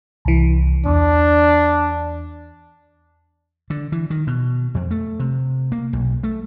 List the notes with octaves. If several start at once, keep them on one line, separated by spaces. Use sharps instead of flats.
C2 E3
E2 D4
D3
E3
D#3
B2
F2
A3
C3
A#3
B1
A3